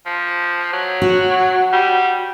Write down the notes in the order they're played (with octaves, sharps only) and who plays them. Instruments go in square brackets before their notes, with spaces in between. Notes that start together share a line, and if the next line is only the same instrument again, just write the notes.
[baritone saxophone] F3
F#3
[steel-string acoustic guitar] F#4
[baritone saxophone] G3